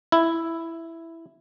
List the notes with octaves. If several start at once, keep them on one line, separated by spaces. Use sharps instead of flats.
E4